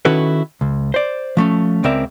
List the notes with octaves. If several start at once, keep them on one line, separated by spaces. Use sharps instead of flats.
D#3 C#4 E4 F#4 A4 B4
C#2
C5 D5
F3 A3 C#4
C#2 C#3 C4 A#4 D5 E5